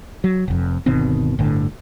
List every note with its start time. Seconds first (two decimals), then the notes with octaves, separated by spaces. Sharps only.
0.24 F#3
0.48 F1 F2
0.86 G1 B2 D#3 C4
1.39 G1 A2 D3